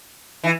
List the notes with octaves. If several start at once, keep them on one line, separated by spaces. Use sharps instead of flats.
E3